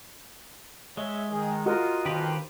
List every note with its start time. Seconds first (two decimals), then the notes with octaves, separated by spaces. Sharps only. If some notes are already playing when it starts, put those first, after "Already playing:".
0.97 G#3 C#5 E5
1.31 D#3 G#4
1.66 F4 F#4 A#4 D#5
2.05 G1 D#3 F3 G4 B4 C5